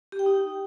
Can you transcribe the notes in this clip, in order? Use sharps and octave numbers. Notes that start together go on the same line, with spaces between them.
G4
G5
D#4